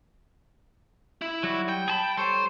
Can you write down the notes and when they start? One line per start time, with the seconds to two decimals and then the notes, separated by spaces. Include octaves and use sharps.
1.22 E4
1.43 F#3 G3 F#4
1.69 G5
1.88 G#4 A5 B5
2.18 G3 A4 C5 C#5